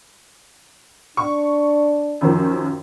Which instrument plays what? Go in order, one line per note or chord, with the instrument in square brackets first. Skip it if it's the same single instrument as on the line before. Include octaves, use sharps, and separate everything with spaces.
[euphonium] D4 [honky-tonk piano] C#6
[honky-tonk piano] F#2 D#3 F3